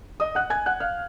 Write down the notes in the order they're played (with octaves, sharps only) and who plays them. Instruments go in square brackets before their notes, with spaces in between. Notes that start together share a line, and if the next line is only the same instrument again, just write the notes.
[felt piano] D#5 D#6
F#5 F#6
G#5 G#6
F#5 F#6
F5 F6